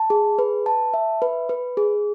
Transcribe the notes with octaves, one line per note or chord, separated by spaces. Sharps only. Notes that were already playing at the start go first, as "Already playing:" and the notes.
Already playing: A5
G#4
B4
A5
E5
B4
B4
G#4